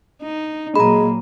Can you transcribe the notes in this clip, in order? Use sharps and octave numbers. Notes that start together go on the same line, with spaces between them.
D#4
A#2 F#3 G#3 A#3 A#5 B5